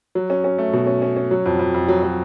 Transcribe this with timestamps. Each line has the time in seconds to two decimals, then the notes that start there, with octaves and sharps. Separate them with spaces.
0.15 F#3
0.30 C#4
0.44 C#4
0.58 A3
0.73 B2
0.87 C#4
1.02 C#4
1.16 C#4
1.31 F#3
1.46 F2
1.59 F2
1.74 F2
1.88 F#3
2.03 F#3